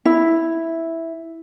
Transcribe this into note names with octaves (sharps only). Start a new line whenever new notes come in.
E4